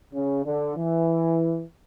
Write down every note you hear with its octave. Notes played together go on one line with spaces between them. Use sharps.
C#3
D3
E3